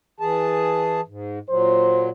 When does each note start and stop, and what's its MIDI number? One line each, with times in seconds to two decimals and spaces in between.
0.20 1.01 52
0.20 1.01 68
0.20 1.01 81
1.08 1.39 44
1.50 2.10 46
1.50 2.10 54
1.50 2.10 72